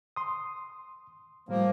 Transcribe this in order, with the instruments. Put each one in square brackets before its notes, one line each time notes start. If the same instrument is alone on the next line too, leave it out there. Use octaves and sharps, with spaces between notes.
[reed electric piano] C6 D#6
[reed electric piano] A2 G3 [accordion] F3 A#3